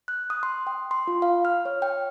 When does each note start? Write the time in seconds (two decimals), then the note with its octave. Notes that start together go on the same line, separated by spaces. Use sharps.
0.08 F#6
0.30 D#6
0.43 C6
0.67 G5
0.91 C6
1.07 F4
1.22 F5
1.45 F6
1.65 C#5
1.82 G5